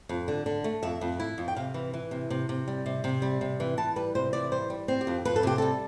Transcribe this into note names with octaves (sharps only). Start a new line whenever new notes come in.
F2
D3
D3
A3
F2 E5
F2
E4
F2
G5
C3 F5
E3
E3
C3
C3
C3
G3
C3
C3
G3
C3
E3
E3 A5
G3 B4
C3 C5
E3 D5
G3 C5
G3
C4
G4
F2
F2 B4
A4
C3 G4
G3 A4